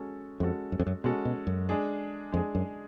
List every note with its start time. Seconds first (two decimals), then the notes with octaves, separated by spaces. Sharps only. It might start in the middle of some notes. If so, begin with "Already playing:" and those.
Already playing: G#3 C#4 F#4 A4
0.40 F2 G#3 C#4 F#4 A4
0.72 F#2
0.79 F2
0.86 F#2
1.04 B2 G#3 C#4 F#4 A4
1.25 B2
1.47 F#2
1.69 G#3 D4 G#4
2.32 F2 G#3 D4 G#4
2.55 F#2